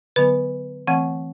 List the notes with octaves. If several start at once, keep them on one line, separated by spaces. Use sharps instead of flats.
D3 F#3 B3 B4
E3 A3 C4 F#5